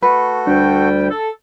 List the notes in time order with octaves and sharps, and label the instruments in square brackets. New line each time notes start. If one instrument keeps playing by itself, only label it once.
[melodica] A3 F#4 A4 [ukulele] B4
[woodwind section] D2 G3 G5 [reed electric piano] D4
[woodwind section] A4